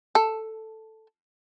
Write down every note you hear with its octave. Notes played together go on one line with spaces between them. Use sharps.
A4